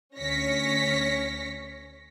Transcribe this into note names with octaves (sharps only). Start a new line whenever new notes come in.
D2 C#4 C#5 A#6 B6 C#7